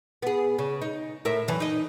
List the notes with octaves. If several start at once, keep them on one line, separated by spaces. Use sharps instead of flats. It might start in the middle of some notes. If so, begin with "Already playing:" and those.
B3 G#4
C#3
D#4
A2 A#4 E5
F#2 E3
D#4 D#5